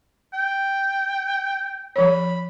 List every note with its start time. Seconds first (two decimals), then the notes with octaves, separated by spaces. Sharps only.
0.33 G5
1.96 F3 C#5 B5